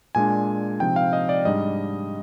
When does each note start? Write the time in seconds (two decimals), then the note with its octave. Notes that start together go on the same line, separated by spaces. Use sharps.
0.15 A#2 G#3 D4 G#5
0.80 C3 F3 C4 D#4 G5
0.96 F5
1.13 D#5
1.29 D5
1.45 G#2 G3 D4 D#5